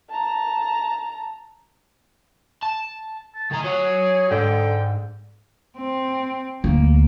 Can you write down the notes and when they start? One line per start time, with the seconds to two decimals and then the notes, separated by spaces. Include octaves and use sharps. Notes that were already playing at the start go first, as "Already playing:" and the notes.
0.10 A5 A#5
2.63 A5
3.35 A5
3.51 D#3 G#4 A#5
3.64 F#3 F#4 C#5
4.31 G#2 D3 G5
5.77 C4
6.64 D2 A#3